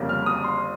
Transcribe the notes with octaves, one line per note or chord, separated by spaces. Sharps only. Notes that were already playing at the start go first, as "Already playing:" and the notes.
Already playing: G1 F2 C#3 G3 A#3
F6
D#6
C6